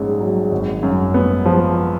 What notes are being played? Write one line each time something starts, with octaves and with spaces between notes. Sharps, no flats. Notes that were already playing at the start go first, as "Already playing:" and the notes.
Already playing: A#1 G#2 C#4
F#3
G#1
F#2
B3
F3